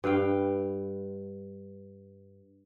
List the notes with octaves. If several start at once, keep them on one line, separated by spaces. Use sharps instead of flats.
G2 B4 F5 G5